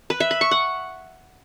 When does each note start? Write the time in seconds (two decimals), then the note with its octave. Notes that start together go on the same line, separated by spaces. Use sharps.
0.10 B4
0.20 E5
0.31 B5
0.41 C#6
0.51 F#5